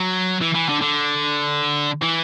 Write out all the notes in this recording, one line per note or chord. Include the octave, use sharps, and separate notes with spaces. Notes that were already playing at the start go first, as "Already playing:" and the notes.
Already playing: F#3
E3
E3
D3
D3
E3